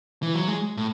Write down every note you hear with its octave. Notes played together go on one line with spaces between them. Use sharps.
E3
F#3
G#3
A2